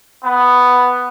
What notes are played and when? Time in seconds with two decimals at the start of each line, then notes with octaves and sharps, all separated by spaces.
0.25 B3